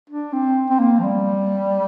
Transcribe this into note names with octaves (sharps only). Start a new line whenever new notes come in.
D4
C4
C4
A#3
F3
G3